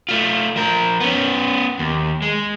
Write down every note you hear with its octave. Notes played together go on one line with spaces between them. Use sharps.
A3 F4
F3 A#4
B3 C#4
D#2
G#3